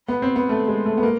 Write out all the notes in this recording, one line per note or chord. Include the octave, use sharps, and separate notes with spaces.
B3
C4
B3
A3
G#3
A3
B3
A#3